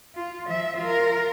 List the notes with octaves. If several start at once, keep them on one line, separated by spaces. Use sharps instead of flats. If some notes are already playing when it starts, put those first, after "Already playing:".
F4
F3 E5
F4 A#4